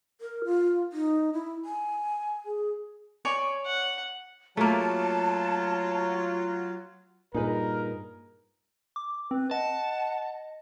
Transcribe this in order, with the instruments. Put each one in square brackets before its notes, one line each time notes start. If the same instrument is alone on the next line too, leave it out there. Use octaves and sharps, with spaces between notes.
[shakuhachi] A#4
F4
D#4
E4
G#5
G#4
[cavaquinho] C#5 D5 G#5
[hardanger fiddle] F#5
[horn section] F#3 F4 [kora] A3 A#3 [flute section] A5
[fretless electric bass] G2 A#2 [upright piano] D#4 G#4 B4 [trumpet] A#4
[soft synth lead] D6
[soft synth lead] C4 [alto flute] B4
[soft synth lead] D#5 [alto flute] F#5 [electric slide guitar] A5